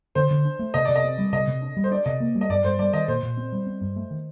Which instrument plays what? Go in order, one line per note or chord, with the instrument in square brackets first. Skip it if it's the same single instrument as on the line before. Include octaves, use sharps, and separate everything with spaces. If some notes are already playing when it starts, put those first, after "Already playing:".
[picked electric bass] D3 [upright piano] C5
[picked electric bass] D3
D4
A3
[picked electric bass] C3 [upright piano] D#5
[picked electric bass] C3 [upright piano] D5
[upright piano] D#5
[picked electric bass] C4
G3
[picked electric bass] C3 [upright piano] D#5
[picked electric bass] C3
D4
G3
[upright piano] C5
[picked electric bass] D4 [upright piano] D5
[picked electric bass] C3 [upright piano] D#5
[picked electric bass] A#3
G3
[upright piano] D#5
[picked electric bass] G2 [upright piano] D5
[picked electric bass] G2 [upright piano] C5
[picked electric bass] G3 [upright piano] D5
[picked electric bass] D#3 [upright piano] D#5
[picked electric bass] A#2 [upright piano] C5
[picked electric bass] A#2
C4
G3
C4
G2
A3
D#3